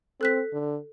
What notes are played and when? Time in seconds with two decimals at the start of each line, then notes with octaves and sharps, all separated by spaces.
0.21 C4 A4 F#6 B6
0.53 D3